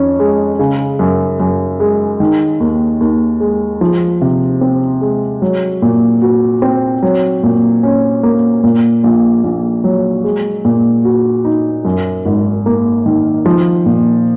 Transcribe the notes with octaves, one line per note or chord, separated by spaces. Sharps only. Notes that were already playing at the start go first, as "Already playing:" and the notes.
Already playing: F2 D#3 C#4
G#3
C#3
F#2
F#2
G#3
D#3
D#2
D#2
G#3
F3
C3
C4
G#3
F#3
A#2
F#4
C4
F#3
A#2
C#4
A#3
A#2
A#1
A#1
F#3
G#3
A#2
F#4
D#4
F#2
G#1
A#3
D#3
F3
A#2